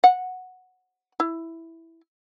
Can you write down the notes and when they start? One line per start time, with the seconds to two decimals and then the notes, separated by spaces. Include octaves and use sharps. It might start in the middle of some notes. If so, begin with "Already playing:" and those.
0.04 F#5
1.20 E4